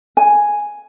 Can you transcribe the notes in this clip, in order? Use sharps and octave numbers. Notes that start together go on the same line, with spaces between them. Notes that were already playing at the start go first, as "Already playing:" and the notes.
G#5